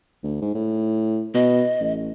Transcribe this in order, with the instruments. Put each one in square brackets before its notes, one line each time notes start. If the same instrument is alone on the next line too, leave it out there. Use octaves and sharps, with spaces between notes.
[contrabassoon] D2
G#2
A2
[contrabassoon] B2 [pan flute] D#5
[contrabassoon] A1